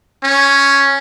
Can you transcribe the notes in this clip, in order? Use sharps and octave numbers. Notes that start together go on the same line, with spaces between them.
C#4